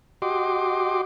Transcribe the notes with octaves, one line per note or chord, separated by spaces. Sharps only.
F#4 G4 D#5 C6 D6